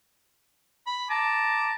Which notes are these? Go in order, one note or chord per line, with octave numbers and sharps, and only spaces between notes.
B5
A5 A#5 D6